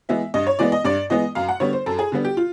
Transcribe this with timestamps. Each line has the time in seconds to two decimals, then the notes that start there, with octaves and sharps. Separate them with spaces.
0.09 E3 G#3 B3 E5
0.34 G2 D#5
0.47 C#5
0.59 E3 G#3 B3 D5
0.72 D#5
0.84 G2 D5
1.10 E3 G#3 B3 D#5
1.35 F#2 F5
1.49 F#5
1.60 D3 G3 B3 C#5
1.73 C5
1.86 F#2 A4
1.99 G#4
2.12 D3 G3 B3
2.25 G4
2.37 F4